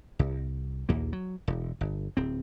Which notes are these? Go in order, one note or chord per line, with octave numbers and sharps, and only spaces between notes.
C2
A#1 D#2 A#3
F#3
E1
G1
D1 C4